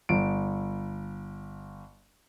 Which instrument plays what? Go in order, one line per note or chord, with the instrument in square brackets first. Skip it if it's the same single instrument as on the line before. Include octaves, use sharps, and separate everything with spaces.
[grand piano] G1 D7